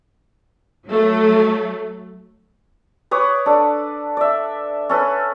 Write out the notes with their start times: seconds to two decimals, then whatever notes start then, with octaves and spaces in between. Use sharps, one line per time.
0.87 F#3 A3
3.11 B4 C#5 D6 D#6
3.46 D4 A4
4.17 D5 E5
4.89 C#4 A4 B4